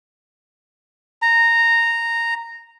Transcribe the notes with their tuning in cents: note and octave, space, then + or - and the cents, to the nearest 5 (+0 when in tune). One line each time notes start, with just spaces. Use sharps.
A#5 -10